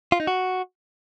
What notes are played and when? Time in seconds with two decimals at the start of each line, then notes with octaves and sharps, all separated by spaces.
0.12 F4
0.20 D#4
0.27 F#4